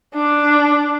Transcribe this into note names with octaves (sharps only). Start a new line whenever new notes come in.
D4